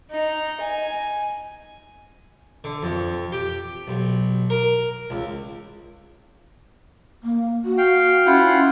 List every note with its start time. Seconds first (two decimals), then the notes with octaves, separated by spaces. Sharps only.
0.11 D#4
0.61 G#5
2.64 D3
2.83 F2
3.32 G4
3.88 B1
4.50 A#4
5.10 C#2
7.23 A#3
7.65 F#4
7.78 F5 G5
8.26 C#4 E4 F4 F#5